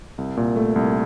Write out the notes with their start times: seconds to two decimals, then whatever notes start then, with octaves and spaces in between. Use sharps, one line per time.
0.18 C2
0.37 A#2
0.56 A3
0.76 C2